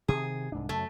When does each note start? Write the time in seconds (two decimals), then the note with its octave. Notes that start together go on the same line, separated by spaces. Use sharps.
0.08 C3 D#3 G#4
0.52 C2 G#2 D4
0.69 F#2 C#3 A3